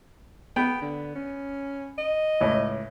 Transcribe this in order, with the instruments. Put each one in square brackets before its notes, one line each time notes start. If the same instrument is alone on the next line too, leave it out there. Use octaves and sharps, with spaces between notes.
[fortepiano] B3 B5 [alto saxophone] G5
[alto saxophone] D3
C#4
D#5
[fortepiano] C#2 A2